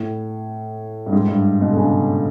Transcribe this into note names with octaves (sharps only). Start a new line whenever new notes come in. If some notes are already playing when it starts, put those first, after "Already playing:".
Already playing: A2
G2
G#2
G2
B2
D3
C#3